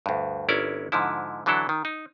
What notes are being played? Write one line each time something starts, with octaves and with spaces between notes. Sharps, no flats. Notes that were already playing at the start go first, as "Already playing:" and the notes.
D2 G2
G1 C#4 E4 A#4 D5
G#2 D3 F3 E4
D3 E3 F#3 D4 E4 A4
D#3
D#4